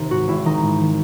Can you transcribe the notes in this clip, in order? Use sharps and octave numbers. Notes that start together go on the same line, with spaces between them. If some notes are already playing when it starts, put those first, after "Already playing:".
Already playing: C3 D#3 D#4
G#2 F#4
G#1 E4
D#3 D#4
G#2
D#3